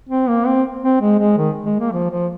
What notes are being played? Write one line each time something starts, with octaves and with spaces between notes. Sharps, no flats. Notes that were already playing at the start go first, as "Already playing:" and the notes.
C4
A#3
C4
C4
G#3
G#3
D#3
G#3
A#3
F3
F3